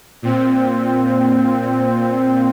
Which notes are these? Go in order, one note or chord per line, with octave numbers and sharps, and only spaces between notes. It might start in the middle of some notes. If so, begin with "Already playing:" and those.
A#2 C4